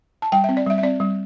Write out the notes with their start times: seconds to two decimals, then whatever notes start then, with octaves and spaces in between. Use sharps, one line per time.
0.22 A5
0.32 G3 G5
0.44 C4 E5
0.57 D5
0.66 G3 E5
0.78 E5
0.83 C4 D5
1.00 G3